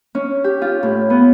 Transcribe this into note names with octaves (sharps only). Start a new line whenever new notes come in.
C#4
G4
F4
A2
B3